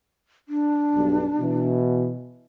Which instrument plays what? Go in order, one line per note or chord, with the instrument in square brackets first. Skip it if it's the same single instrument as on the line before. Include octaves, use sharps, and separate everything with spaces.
[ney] D4
[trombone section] B1 G2
B2 E3